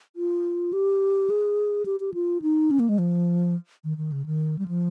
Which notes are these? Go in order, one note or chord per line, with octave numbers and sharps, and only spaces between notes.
F4
G4
G#4
G4
G4
F4
D#4
C#4
A#3
G#3
F3
D#3
D#3
C#3
D#3
G3
F3